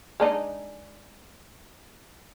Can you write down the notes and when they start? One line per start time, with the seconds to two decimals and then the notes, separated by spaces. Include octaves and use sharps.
0.20 G#3 D4 D#4